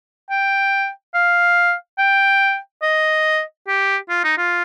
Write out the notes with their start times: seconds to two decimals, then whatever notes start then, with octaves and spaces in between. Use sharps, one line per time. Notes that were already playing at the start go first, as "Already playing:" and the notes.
0.30 G5
1.14 F5
1.99 G5
2.82 D#5
3.68 G4
4.09 F4
4.24 D#4
4.38 F4